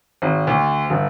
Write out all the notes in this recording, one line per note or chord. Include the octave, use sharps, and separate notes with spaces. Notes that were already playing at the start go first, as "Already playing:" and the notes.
G#1
D2
G1